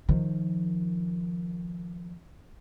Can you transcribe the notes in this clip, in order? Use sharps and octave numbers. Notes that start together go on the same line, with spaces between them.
D#3 F3